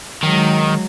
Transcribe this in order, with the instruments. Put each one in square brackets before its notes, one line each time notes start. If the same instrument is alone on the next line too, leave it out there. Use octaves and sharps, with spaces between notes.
[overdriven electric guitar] D#3 [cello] F#3 G#3